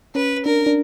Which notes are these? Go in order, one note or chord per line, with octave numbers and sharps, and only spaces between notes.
C#4 B4
D4 A#4
D4